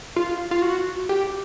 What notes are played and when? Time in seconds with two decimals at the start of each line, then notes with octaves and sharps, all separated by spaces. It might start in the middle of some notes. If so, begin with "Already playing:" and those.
0.16 F4
0.51 F4
0.62 F#4
1.09 G4